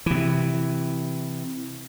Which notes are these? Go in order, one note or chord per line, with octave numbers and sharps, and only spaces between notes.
C3 E3